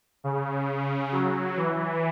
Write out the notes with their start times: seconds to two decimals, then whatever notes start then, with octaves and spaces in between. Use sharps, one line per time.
0.24 C#3
1.12 F#3
1.57 E3